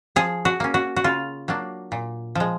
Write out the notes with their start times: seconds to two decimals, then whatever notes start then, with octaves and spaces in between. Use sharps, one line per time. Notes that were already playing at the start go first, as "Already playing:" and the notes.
0.16 F3 G#4
0.45 F#4
0.60 A#3 C#4
0.74 F#4
0.96 F#4
1.04 C#3 F4
1.48 F#3 A#3 D4
1.92 A#2
2.35 F3 G#3